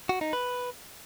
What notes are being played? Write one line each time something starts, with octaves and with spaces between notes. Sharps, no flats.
F#4
D#4
B4